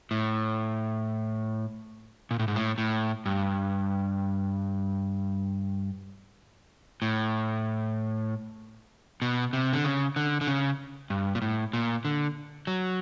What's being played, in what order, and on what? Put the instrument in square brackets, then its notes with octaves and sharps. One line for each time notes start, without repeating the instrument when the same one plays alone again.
[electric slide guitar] A2
A#2
A2
G#2
A2
A2
G2
A2
B2
C3
D3
C#3
D3
D3
C#3
G2
A#2
A2
A#2
D3
F#3